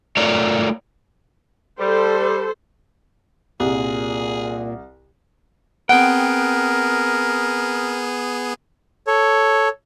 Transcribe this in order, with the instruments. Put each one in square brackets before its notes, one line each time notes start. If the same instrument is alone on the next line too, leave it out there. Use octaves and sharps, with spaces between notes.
[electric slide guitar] A3 F4 A4 A#4 C#5 D5
[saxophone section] G3 [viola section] A4 C5
[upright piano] C2 [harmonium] A#2 [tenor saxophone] G#4
[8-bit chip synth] B3 G#4 [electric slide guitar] C4 G5 [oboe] A#4 [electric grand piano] F#5
[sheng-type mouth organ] A4 C#5